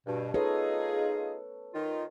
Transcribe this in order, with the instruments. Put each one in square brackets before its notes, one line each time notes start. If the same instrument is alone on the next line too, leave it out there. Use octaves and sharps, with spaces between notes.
[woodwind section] G2 B2
[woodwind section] D#4 F4 G#4 [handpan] A4 B4 C#5
[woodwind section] D#3 F4